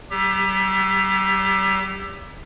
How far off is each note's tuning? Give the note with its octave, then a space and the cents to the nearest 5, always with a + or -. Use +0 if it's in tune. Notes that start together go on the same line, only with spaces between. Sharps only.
G3 -45 G4 +25